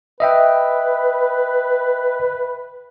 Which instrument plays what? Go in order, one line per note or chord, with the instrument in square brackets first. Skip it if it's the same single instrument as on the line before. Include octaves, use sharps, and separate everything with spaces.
[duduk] B4 [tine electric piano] D#5 E5 G5